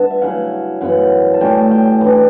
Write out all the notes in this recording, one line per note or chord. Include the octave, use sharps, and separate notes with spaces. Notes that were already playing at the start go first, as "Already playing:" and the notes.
Already playing: G2 B3 A5
E5
C#3 F#3 C#4 E4 F#5
F#2 C#3 E3 B3 F#5
A5
A2 G3 C#4 G5
G5
E3 G3 D4